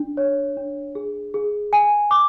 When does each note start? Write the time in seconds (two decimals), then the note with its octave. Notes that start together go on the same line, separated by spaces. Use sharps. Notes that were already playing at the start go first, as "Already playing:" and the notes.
Already playing: D4
0.17 C#5
0.57 D4
0.95 G#4
1.34 G#4
1.73 G#5
2.11 D6